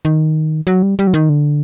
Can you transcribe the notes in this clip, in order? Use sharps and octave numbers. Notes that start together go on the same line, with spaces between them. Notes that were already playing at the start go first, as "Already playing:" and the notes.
D#3
F#3
G3
G3
F#3
D#3
D3